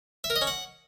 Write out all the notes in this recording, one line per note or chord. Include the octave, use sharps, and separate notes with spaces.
E5
A#4
D#5
C#4
F#5